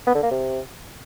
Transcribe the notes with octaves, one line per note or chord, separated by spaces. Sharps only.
B3
D3
A#3
C3